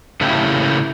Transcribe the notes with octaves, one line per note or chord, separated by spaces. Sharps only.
A2 C#3 A3 A#3 E4 G4